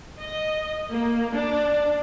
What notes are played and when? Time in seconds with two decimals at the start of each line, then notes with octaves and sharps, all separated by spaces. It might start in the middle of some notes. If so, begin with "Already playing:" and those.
0.20 D#5
0.91 A#3
1.35 D4